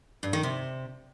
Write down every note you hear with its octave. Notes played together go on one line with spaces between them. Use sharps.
G2
D#3
C3